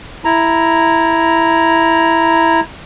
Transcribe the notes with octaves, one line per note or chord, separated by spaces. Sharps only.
E4 A#5